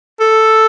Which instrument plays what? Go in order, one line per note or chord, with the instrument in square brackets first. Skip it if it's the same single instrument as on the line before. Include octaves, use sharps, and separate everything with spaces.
[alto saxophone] A4